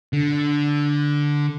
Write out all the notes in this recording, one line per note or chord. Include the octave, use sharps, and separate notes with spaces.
D3